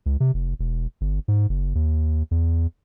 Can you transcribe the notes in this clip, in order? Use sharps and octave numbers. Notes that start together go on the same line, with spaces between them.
C#2
C3
F1
E1
G1
G#2
F#1
D#2
E2